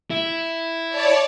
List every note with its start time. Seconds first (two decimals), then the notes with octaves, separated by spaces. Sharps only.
0.10 E4
0.89 C#5 D5 A5